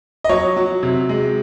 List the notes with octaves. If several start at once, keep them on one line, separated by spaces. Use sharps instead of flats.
D#5
F#3 C#5
F#3
C3
G#3